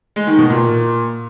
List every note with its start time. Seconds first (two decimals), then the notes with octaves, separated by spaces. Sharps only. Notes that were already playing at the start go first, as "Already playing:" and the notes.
0.16 G#3
0.27 D#3
0.38 B2
0.50 A#2